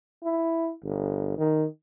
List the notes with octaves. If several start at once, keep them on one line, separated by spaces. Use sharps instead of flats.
E4
G1
D#3